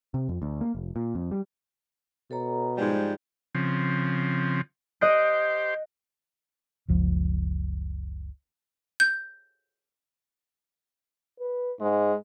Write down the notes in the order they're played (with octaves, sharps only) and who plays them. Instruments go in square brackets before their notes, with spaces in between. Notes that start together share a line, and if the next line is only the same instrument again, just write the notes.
[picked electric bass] C3
F2
D2
A#3
F1
A#2
F2
G3
[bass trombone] B2 [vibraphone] A4 C#5 A#5
[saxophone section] G#2 F3 G3 [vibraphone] G#3
[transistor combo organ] C#3 F3 C4
[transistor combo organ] G4 C5 [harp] D#5 F#6 D7
[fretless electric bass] F#1 C#2 F3
[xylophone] G6
[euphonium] B4
[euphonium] G#2 [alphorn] G#3